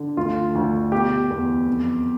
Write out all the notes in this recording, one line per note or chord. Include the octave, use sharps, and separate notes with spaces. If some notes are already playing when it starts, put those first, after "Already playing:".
Already playing: D3
D2 F4
D2
B2 G4
E2
F2